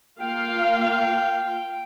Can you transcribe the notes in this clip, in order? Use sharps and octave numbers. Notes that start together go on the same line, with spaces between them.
A#3 F4 F5 G5